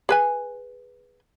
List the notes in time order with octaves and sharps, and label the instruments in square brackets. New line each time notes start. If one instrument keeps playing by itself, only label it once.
[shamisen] G#4 B4 G#5